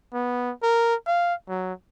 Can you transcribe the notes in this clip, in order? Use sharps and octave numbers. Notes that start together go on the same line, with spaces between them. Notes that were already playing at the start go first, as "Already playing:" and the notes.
B3
A#4
F5
F#3